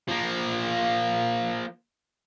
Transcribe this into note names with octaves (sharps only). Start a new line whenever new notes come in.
F3 A#3